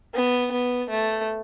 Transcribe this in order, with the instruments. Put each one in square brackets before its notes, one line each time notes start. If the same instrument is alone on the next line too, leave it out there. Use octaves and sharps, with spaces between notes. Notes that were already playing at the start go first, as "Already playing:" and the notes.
[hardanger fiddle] B3
B3
A3